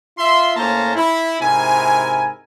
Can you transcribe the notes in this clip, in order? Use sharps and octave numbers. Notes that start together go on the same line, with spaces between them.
F4 E5 C6
A2 A#3 C#4 C5 A5 A#5
E4
G#2 C3 E4 A#4 G#5